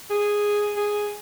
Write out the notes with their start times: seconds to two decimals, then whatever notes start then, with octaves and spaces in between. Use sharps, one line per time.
0.10 G#4
0.76 G#4